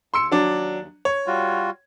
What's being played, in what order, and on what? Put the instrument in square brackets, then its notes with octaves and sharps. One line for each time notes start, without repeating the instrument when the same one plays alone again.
[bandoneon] D#2 [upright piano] C6 E6 C#7
[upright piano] F#3 D4
C#5
[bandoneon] G3 F4 F#4